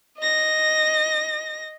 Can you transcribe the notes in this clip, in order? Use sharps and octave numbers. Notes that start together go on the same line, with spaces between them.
D#5 A#6